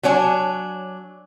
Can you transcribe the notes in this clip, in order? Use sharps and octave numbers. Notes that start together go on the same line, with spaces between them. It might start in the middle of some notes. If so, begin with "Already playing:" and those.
F#3 D4 C#5 G#5